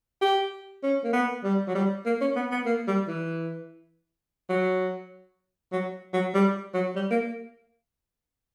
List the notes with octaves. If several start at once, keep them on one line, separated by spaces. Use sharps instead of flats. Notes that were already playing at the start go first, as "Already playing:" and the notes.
G4
C#4
A#3
B3
G3
F#3
G3
A#3
C#4
B3
B3
A#3
G3
E3
F#3
F#3
F#3
G3
F#3
G3
A#3